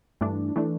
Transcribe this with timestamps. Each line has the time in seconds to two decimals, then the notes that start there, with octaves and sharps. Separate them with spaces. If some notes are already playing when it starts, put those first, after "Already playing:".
0.21 G2 E3 A3 D4
0.56 E3 A3 D4